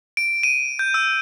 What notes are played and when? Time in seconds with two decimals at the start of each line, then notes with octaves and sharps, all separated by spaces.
0.17 D7
0.43 D#7
0.79 G6
0.94 E6